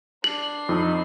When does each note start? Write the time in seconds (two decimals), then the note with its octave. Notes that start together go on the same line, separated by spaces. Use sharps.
0.24 D4 C7 F#7
0.69 F2 D#4